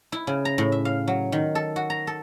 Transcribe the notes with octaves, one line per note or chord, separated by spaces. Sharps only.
E4
C#3
A#5
A2
E5
F5
F#3
D#3
A4
F#4
A#5
A4